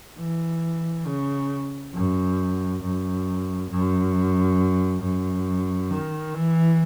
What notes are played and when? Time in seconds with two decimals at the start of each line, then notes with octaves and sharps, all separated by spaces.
0.19 E3
1.06 C#3
1.95 F#2
2.83 F#2
3.70 F#2
5.02 F#2
5.91 D#3
6.34 E3